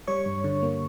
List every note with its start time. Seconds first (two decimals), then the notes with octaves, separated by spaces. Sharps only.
0.07 G3 C#5 C#6
0.26 G2
0.44 D3
0.62 A#3